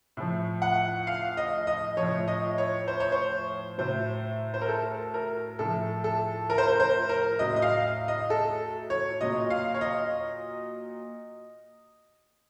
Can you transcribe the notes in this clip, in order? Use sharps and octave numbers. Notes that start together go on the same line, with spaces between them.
A2 F3
F#5
F5
D#5
D#5
F3 C#5
A2
D#5
C#5
C5
C#5
C5
A2 F#3 C5
C5
A#4
A4
A#4
A2 F3 A4
A4
A#4
C5
A#4
C5
A#4
A2 F#3 D#5
D#5
F5
D#5
A4
C#5
A#2 F#3 D#5
F5
C#5
D#5